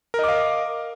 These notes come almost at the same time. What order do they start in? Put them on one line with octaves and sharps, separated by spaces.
A#4 D#5 D6 F5